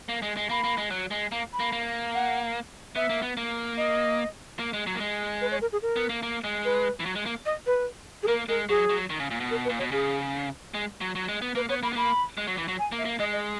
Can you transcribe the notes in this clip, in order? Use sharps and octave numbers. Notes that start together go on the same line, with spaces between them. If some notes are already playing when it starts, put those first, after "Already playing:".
A#3
G#3
G#3
A#3 B5
A#3
G#3
F#3
G#3
A#3
B5
A#3
A#3
F#5
B3 E5
A#3
B3
A#3
D#5
A#3
G#3
F#3
A#3
G#3
B4
C#5
A#4
G#4
A#4
B3
A#3
A#3
G#3
B4
E3
F#3
G#3
A#3
D#5
B4
G#4
A#3 A#4
G#3 A#4
F#3 G#4
F#3
D#3
C#3
A#2
B2
A#4
B4
A#2
B2 C#5
C#3 G#4
G#3
F#3
F#3
G#3
B3
A#3 B4
B3 C#5
A#3 B5
B3
A#3 B5
G#3
F#3
E3
F#3
G#5
A#3
E5
A#3
G#3 D#5
D#5